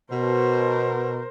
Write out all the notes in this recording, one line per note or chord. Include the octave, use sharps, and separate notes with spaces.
B2 A#4 C5